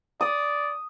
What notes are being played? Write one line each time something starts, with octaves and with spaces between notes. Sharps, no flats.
D5 D#6